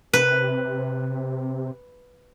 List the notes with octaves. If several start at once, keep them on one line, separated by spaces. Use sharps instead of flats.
C3 B4